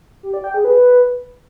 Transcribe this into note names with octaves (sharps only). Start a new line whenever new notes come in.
G4
D5
G5
G#4
B4